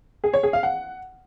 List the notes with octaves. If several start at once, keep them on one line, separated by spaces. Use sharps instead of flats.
G#4
C#5
G#4
F5
F#5